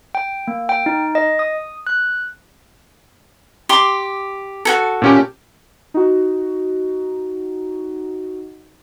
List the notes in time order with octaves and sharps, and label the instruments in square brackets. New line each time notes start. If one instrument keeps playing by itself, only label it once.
[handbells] G5
A#3
G5
D#4
D#5
D#6
F#6
[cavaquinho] G4 C6 D6
F#4 G#4 A4
[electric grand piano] A#2 C#4 G4
[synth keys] D#4 F#4